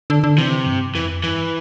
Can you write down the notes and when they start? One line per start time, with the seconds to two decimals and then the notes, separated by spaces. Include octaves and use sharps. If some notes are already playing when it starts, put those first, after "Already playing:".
0.10 D3
0.24 D3
0.38 C3 E3
0.66 G2
0.95 F2 E3
1.23 G2 E3